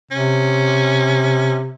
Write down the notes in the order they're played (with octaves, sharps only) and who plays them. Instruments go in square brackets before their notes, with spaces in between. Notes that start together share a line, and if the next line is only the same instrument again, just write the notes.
[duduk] C3 [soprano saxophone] C#4